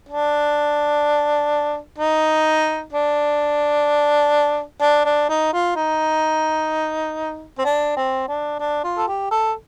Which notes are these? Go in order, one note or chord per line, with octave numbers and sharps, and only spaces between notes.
D4
D#4
D4
D4
D4
D#4
F4
D#4
C4
D4
C4
D4
D4
F4
A4
G4
A4